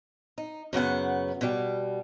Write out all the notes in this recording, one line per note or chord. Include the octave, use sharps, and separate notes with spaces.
D#4
F#2 C#3 B3 F#5
B2 G3